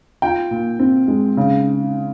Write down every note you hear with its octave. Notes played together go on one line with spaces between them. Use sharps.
F4 G5
A#2
C4
G#3
C#3